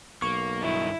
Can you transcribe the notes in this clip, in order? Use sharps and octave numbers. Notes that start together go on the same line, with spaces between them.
B1 A#3 C#6
G2 D#3 E4